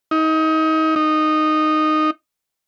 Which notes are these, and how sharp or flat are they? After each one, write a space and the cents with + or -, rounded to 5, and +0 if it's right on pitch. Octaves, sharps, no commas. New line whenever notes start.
D#4 +30
D#4 -10